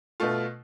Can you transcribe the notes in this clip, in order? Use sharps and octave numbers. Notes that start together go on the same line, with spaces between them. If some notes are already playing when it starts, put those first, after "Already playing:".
B2 A3 F4